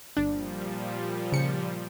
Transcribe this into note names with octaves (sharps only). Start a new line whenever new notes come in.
G1 A#2 F3 G3 D4
C#3 C#7